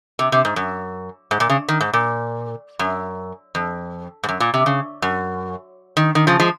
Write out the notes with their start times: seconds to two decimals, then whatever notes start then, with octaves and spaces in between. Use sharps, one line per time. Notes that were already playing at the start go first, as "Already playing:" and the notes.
0.19 C3
0.32 C3
0.45 G#2
0.56 F#2
1.31 G#2
1.40 A#2
1.50 C#3
1.69 D#3
1.81 G#2
1.93 A#2
2.79 F#2
3.55 F2
4.23 G#2
4.29 F#2
4.40 A#2
4.54 C3
4.66 C#3
5.02 F#2
5.97 D#3
6.15 D#3
6.27 C#3 F3
6.40 F3 G#3